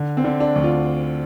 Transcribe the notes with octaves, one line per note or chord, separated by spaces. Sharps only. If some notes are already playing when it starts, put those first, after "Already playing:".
Already playing: D3
C4
D3
D4
D2
F4